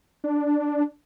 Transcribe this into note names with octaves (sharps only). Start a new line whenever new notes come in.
D4